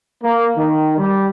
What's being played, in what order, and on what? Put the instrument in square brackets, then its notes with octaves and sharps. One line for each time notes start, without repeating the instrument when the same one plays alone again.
[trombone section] A#3
D#3
G3